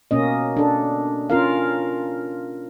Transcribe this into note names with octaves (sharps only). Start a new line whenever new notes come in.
B2 A#3 C#4 D#5
D4 A4
C#4 F4 A#4 F5